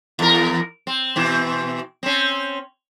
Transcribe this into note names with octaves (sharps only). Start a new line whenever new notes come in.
E2 A#4
C4
B2 E3 C4
C4 C#4